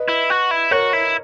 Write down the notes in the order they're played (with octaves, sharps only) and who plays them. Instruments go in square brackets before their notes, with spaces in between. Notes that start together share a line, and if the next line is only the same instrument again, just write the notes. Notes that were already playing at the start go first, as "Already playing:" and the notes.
Already playing: [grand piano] B4 D#5
[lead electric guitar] E4
F#4
E4
[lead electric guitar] F#4 [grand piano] A#4 C#5
[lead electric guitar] E4